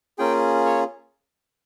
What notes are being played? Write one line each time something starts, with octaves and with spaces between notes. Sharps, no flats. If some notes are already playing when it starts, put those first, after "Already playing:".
A#3 C#4 F4 G#4 G5
C#5